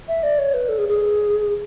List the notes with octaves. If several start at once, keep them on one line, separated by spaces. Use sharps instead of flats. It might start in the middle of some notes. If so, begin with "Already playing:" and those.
E5
D5
C#5
B4
A4
G#4
G#4